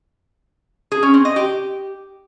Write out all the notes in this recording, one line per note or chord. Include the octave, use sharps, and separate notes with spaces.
G#4
C#4
C4
D#5
G4